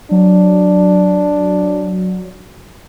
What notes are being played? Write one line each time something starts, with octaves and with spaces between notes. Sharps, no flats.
F#3 D4